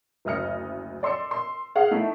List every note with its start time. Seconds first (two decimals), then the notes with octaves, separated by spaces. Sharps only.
0.25 F#1 D2 D#5 F6 C#7
1.03 D5 C6 E6 C#7
1.31 C6
1.75 G#4 F5 F#5
1.91 A3 D#4 E4 E5